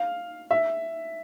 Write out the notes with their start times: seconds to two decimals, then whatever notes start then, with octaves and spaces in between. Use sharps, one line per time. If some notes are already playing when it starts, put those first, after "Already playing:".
Already playing: F5
0.51 E5